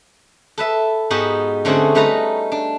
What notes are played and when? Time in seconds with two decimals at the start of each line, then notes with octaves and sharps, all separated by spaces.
0.58 A4 B4 E5
1.10 G#2 B3 D#4 F#4 G4
1.65 D3 A3 C4 C#4 F#4 G#4
1.95 G3 A3 D#4 B4 A#5
2.52 D4